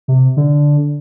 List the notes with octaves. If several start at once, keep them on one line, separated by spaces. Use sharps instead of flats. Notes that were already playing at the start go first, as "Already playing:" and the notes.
C3
D3